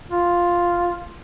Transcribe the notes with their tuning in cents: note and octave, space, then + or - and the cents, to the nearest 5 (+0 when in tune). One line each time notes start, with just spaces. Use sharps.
F4 +0